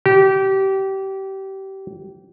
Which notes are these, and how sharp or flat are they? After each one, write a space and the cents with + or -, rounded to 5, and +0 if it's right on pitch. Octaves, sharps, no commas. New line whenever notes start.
G4 -25